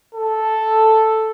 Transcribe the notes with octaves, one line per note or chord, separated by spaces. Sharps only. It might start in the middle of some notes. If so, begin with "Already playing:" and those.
A4